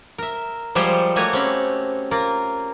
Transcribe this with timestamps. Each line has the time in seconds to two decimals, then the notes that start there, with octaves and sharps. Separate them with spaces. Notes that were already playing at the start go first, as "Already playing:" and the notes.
0.18 A#4 E5
0.75 F3 G3 G#3 G4 C5 C#5
1.16 A3 A#3 F#4 G4 C#5 G#5
1.33 C4 C#4 B5
2.11 A#3 F4 A#4